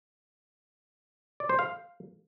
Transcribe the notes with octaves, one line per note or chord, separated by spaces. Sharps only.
D5
C5
F5